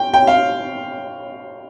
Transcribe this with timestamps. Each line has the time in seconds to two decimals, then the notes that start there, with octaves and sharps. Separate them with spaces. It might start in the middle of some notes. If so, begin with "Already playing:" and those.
Already playing: G5
0.14 G5
0.27 F5